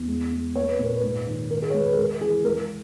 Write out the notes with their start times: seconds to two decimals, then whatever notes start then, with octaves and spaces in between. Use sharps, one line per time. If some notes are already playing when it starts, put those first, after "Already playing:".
Already playing: E2
0.08 G#3
0.32 G#3
0.56 A#3 C#5
0.69 B4
0.79 A#2 A#4
0.96 B4
1.03 G#2
1.27 D#3
1.50 D#3 A#4
1.62 G#4
1.70 C#5
1.74 G#3 B4
1.86 B4
1.93 G#4
1.97 G#3 A#4
2.21 E3 G#4
2.44 G#3 A#4